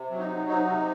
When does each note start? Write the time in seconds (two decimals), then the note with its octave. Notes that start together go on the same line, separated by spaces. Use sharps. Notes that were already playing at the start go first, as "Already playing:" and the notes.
Already playing: C3
0.11 F#3
0.19 D#4
0.29 F#3
0.47 C3 D#4
0.66 C3